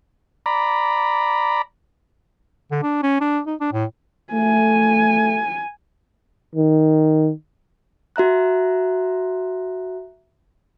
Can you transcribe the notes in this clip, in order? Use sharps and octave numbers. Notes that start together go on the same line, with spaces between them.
D5 A#5 B5
D3
D4
C#4
D4
D#4
D4
A2
A3 G#5
D#3
F#4 E5 A#5 F#6